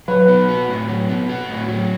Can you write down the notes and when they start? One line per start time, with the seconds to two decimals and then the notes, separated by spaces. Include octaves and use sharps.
0.08 F#3 B4
0.28 B3
0.48 F#4
0.69 A2
0.88 F#3
1.09 B3
1.29 F#4
1.49 A2
1.69 F#3